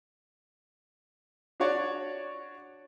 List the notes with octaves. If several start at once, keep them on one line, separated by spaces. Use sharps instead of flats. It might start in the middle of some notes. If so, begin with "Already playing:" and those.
D4 F#4 C#5 D5